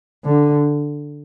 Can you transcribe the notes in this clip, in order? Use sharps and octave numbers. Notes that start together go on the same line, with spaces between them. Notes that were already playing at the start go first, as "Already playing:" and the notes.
D3